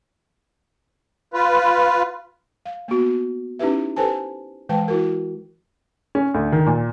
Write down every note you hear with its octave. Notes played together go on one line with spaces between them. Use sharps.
F4 B4
F5
A#3 B3 F#4
C#4 D#4 E4 G4 B4 E5
G4 A4 B4 C5 G#5 A5
E3 G#3 B4 G5 A5
E4 F#4 A#4
C#4
D2
D#3
A#2